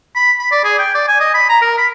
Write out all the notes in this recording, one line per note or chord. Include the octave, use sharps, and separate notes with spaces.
B5
B5
D5
G#4
G5
D5
G#5
D#5
B5
A#5
A#4
B5